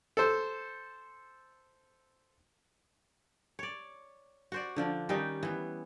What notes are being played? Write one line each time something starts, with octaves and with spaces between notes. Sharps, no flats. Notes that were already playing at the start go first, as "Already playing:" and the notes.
A4 C5
C#5 D5
F#4 C5 D5
D3 F3 D4
D#3 G3 C#4 D#4
E3 B3